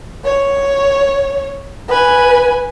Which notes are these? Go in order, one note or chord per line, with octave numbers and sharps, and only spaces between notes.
C#5
B4 G#5